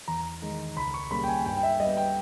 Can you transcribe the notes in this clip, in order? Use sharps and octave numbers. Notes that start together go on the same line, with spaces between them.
E2 A#5
D#3 G#3
C#2 B5
C#6
C#3 G3 A#3 B5
G5
G#5
G2 G5
G5
E5
G3 B3 D#5
G5